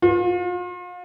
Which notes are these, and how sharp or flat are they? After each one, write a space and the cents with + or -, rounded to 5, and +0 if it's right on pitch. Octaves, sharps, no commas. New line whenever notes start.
F4 +40